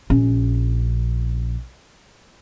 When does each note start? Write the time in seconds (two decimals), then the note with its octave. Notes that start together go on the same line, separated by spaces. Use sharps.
0.10 A#1 C#4